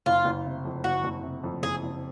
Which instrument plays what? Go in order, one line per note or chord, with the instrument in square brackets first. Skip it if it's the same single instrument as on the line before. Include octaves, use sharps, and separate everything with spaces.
[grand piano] F#1 [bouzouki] F4
[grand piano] F#1
C3
F2
[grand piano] F#1 [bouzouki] F#4
[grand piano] F#1
C3
F2
[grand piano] F#1 [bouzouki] G#4
[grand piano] F#1